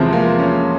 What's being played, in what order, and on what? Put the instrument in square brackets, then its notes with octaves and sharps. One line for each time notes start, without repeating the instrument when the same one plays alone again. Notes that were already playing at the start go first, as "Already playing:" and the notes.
Already playing: [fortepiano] E2 C3 F3 [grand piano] G#3
[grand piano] A#3
C#4